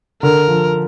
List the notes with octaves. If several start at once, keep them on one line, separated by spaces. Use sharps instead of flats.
D3 A#4
F3